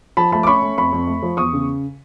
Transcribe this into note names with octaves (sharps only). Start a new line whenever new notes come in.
F3 A5 B5
A3 A5 B5
D6
C#4 B5 C#6
A3
F2 B5 C#6
F2
A3
F3
E2 C#6 D#6
C#3